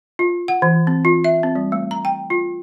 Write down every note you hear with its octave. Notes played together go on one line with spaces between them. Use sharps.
F4
F#5
E3
C4
F4
E5
C4
G3
A3
A#5
G5
F4